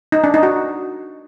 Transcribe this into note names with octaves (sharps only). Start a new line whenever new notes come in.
D#4
D4
D#4
F#4